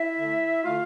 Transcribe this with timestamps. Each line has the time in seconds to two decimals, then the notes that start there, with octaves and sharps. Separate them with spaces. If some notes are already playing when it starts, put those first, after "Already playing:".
Already playing: E4 E5
0.18 D3
0.23 A3
0.63 D3 A3 F4 F5